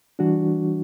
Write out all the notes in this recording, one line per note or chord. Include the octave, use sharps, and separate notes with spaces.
E3 G3 D4 F#4